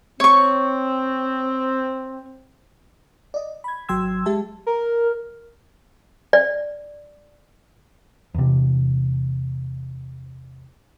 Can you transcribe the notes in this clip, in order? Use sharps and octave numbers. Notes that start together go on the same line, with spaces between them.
C4 C#5 C#6
D5 D#5
B5 G#6
G#1 F#3 G5 C6 E6 G#6
G#3 G4 E5 A5
A#4
D5
E2 C3